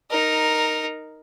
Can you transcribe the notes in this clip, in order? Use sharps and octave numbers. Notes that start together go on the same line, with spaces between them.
D#4 A#4